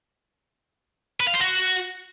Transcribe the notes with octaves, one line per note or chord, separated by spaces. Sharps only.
B4
F5
C5
F#4